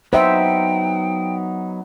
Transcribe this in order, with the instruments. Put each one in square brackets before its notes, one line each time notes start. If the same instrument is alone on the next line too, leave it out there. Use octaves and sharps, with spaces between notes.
[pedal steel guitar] F#3 B3 D#4 [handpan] C5 E5 [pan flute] G5